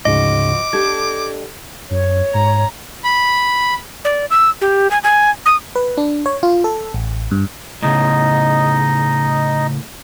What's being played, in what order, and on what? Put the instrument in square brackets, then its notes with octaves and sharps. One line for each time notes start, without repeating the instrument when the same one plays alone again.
[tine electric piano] D2 G#2 C#3 [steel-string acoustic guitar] F3 F#4 [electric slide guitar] D#5 [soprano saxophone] D6
[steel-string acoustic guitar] D4 G4 A4 [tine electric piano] G6 G#6
[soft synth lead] F#2 [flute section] C#5
[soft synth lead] G#2 [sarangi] A#5
[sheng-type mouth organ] B5
[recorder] D5
E6
G4
G#5
G#5
D#6
[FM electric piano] B4
D4
C#5
F4
A4
A1
G2
[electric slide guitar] A2 C#3 [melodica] D#4 D#5